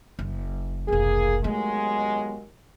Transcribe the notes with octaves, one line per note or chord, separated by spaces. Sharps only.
F#1
F1 B1 A#3 G#4
D#2 F#3 G#3 A3 B3